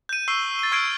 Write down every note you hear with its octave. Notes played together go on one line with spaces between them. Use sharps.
G6 D#7
C#6 E6 C7 D#7 G7
A6 D#7
C#6 F6 G#6 C7 D7 D#7